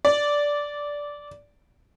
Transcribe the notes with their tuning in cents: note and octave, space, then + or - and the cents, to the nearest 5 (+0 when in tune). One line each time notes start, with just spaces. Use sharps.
D5 -10